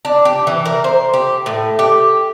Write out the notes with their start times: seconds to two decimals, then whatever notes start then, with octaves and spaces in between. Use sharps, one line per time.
0.05 D4
0.25 G4
0.47 E3
0.65 A#4
0.84 C5
1.14 G4
1.46 A2
1.79 G4